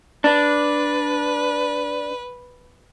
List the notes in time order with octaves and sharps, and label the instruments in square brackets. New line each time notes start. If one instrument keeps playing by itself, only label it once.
[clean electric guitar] D4 [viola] B4